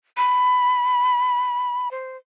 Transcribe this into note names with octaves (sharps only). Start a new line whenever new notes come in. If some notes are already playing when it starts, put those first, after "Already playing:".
B5
C5